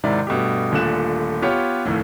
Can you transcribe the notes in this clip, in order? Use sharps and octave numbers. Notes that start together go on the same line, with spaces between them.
G#2 C3 D#3 E4 D5
G2 B2 A3 G4
D#1 A#2 D3 A3 F#6 E7
B3 F4 G4 B4 C#5
F1 D#2 A2